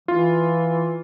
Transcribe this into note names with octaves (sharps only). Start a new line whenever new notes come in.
E3 F4